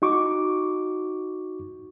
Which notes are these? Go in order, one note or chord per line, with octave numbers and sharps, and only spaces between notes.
D#4 F#4 C#6 D6